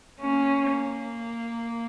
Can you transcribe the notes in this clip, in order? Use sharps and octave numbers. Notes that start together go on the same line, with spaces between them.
A#3 C#4